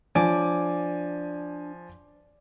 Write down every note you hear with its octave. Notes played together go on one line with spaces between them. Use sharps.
F3 D4 D5 G#5